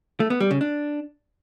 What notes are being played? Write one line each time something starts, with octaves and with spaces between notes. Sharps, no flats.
A3
B3
G3
C#3
D4